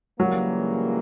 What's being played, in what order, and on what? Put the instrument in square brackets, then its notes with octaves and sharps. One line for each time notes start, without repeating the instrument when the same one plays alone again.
[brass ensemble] C#2 C#3 E3 G3 A#3 [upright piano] F#3